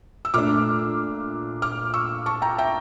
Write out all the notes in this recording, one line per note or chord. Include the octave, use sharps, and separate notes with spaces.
E6
A#2 A3 D4 D6 F6
D6 F6
C#6 E6
A5 C#6
G5 A#5
E5 G5